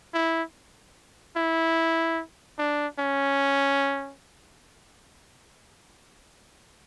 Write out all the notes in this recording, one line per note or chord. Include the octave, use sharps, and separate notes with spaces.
E4
E4
D4
C#4